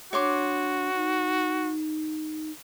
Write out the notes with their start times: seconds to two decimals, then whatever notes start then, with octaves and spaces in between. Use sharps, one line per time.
0.13 D4 F#4 C#5 C6 D6
0.95 D#4